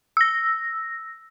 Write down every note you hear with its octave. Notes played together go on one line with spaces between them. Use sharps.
E6 A#6